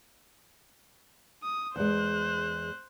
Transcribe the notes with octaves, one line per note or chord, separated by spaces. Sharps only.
D#6
E2 G#3 C5 F#6